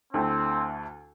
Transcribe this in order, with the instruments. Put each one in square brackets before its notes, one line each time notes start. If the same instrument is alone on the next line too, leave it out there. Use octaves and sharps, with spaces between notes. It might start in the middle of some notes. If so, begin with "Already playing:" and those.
[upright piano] D2 D3 A3 E4 [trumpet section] C4